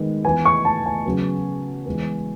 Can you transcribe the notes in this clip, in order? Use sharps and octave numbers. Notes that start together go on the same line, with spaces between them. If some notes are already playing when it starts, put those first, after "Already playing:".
Already playing: D#3 G#3 B3
E3 B3 G#5
C#6
A5
G#5
C#3 F#3 B3
E3 G#3 B3